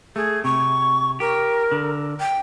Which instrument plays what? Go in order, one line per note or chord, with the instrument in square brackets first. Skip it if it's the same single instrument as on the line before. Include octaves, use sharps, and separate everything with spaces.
[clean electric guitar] A3 [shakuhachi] G#4
[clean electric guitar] C3 [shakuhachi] C#6
[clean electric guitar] G4 [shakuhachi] A#4
[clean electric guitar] D3
[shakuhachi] G5